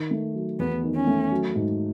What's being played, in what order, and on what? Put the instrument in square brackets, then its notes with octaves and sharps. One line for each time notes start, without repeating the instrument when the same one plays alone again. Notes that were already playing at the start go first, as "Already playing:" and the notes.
Already playing: [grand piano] D#3
A3
F#3
[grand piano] E2 [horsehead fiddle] B3
[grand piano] D#3
[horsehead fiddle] C#4
[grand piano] A3
F#3
G#2